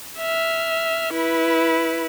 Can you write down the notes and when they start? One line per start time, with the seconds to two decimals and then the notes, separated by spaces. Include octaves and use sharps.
0.19 E5 F6
1.13 E4 B4